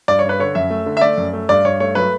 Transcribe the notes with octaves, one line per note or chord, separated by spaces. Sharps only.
G2 D5
C#5
G2 B4
D3 C#5
F#2 E5
A3
D3
E5
A3 D5
F#2
A3
G2 D5
G2 C#5
A3 C#5
F#3 B4